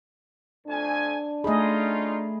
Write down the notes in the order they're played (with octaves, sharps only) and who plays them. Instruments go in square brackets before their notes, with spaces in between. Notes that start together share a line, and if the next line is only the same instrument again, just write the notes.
[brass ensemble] F2 A3 G#5 [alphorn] D4
[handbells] A3 B5 [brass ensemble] C#4 D#4 F4 [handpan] G#4 D#5